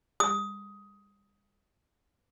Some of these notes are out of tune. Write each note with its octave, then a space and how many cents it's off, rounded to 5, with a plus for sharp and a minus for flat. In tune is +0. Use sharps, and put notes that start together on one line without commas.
D#6 +15